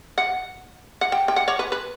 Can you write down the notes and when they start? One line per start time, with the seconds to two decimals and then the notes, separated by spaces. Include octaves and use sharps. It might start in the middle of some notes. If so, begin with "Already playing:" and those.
0.18 F#5
1.01 F#5
1.12 G5
1.28 G5
1.36 F#5
1.48 C#5
1.59 B4
1.72 B4